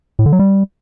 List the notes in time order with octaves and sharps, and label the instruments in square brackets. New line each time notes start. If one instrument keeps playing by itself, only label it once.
[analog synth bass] A2
D3
F#3
G3